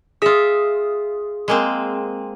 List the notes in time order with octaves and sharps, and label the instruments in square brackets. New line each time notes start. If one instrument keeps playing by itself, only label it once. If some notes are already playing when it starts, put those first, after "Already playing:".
[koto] F4 E5 [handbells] G#4 D#6
[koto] G#3 A#3 C4